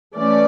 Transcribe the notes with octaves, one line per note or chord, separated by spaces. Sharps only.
E3 A3 C#4 D5